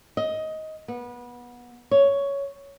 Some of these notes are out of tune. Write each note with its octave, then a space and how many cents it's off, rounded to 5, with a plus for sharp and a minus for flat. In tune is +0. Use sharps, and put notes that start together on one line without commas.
D#5 +15
B3 -25
C#5 +10